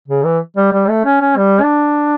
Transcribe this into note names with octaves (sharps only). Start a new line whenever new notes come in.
C#3
E3
G3
G3
A3
C#4
C#4
G3
D4